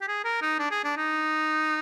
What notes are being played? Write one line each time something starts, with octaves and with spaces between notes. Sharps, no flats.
G4
G#4
A#4
D#4
D4
G#4
D4
D#4